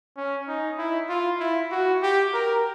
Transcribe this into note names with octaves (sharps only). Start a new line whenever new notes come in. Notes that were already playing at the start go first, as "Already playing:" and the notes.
C#4
D#4
E4
F4
E4
F#4
G4
A#4